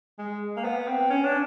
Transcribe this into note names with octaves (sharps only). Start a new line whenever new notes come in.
G#3
A#3
B3
C4
C#4
D4